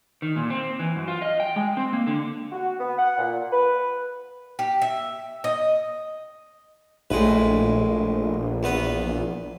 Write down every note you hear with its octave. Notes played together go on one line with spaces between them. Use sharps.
D#3
A#2
C4
E3
F#2
F4
D#5
G5
G#3
C4
A#3
D3
F#4
B3
F#5
A#2
B4
G4
E5
D#5
A#1 A2 G#3 B4
E2 B3 B4